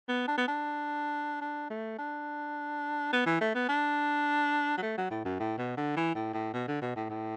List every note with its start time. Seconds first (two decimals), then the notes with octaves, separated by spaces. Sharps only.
0.09 B3
0.28 D4
0.37 B3
0.48 D4
1.41 D4
1.70 A3
1.98 D4
3.13 B3
3.26 E3
3.41 A3
3.55 B3
3.69 D4
4.78 F#3
4.82 A3
4.97 F#3
5.11 A2
5.25 F#2
5.40 A2
5.58 B2
5.77 D3
5.96 E3
6.15 A2
6.34 A2
6.53 B2
6.68 D3
6.82 B2
6.96 A2
7.10 A2